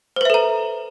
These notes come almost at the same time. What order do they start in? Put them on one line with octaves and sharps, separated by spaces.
C5 B4 E5 A4 A#5